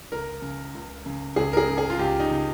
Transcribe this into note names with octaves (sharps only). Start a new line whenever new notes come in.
C#2 A#4
C#3
C#2
C#3
C#2 G#4
A#4
G#4
C#3
G#4
F4
C#2 G4
D#4
C#3